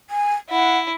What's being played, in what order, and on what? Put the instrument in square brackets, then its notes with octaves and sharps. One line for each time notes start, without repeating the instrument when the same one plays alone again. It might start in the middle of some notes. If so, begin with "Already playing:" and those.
[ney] G#5
[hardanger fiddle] E4 [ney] F#5